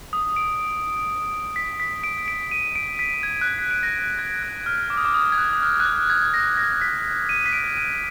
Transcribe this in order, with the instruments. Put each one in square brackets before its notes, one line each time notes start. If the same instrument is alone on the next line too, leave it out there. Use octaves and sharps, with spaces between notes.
[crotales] D#6
D7
B6
B6
D7
D7
D#7
D7
B6
G#6
F#6
G#6
B6
D7
A#6
G#6
F#6
F6
D6
D#6
D6
D#6
G#6
F#6
D#6
F6
F#6
G#6
G#6
A#6
A#6
B6
D#7
B6
D7
D#7